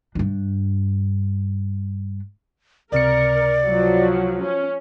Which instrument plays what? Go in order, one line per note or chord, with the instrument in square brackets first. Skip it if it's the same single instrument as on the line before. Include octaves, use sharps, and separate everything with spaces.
[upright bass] G2 D4
[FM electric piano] C#2 C3 C#7 [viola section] A#4 [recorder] D5
[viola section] F3 F#3
C#4